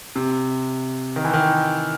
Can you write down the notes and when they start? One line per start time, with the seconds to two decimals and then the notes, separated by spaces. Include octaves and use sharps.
0.16 C3
1.16 D#3
1.25 E3
1.34 D#3